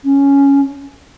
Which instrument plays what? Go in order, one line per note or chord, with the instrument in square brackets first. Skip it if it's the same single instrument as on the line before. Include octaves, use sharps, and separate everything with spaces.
[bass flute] C#4